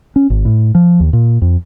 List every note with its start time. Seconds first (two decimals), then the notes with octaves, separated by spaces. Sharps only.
0.16 C#4
0.30 G#1
0.45 A2
0.75 F3
1.00 D#2
1.13 A#2
1.42 F2